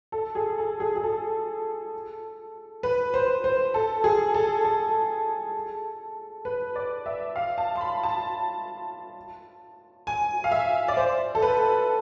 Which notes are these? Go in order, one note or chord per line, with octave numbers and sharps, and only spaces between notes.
A4
G#4
A4
G#4
G#4
A4
B4
C5
C5
A4
G#4
A4
A4
B4
D5
E5
F5
A5
C6
B5
A5
G#5
F5
E5
D5
C5
A4
B4